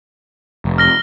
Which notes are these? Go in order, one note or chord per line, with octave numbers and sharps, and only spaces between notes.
F1
F6 A#6 G7